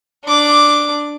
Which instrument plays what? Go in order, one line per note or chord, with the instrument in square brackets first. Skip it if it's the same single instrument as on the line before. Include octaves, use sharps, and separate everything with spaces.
[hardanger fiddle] D4 D6